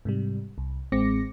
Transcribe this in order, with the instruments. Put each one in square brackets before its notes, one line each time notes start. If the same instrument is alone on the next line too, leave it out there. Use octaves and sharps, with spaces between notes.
[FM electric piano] G#2 C3 G3
C2
A1 G#3 C4 D6 A#6 C#7